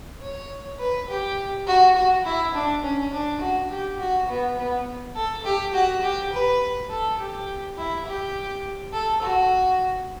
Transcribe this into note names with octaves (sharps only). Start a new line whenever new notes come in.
C#5
B4
G4
F#4
F#4
E4
D4
C#4
D4
F#4
G4
F#4
B3
B3
A4
G4
F#4
G4
B4
A4
G4
E4
G4
A4
F#4